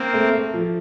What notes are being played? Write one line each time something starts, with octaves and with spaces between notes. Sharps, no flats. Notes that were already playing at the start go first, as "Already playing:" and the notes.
Already playing: A#3 C4
A3
A3
F3